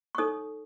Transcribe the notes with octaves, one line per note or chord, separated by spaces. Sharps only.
C#6
D#4 A4 C#5 D#6